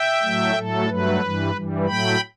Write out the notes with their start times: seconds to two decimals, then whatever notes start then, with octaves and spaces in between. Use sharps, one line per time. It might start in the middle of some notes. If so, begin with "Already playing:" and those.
Already playing: E5 G5
0.22 A2 F#3 A3
0.55 A2 F#3 A3 A4
0.88 G2 F#3 A3 B4
1.21 G2 E3 G3
1.53 G2 E3 G3
1.86 A2 F#3 A3 G5 B5